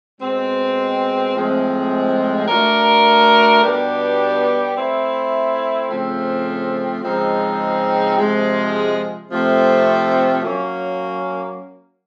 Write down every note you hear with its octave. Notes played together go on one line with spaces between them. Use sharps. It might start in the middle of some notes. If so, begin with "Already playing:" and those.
B2 G#3 C4
A2 F3 G#3 C4
A3 D4 F#4 A#4
B2 G3 B3 D4 G4
A3 C4 E4
C#3 F3 A3 C4
C#3 F3 G#3 C4 D#4
C3 F3 G#3
C3 F3 A3 C4
F#3 A#3 C#4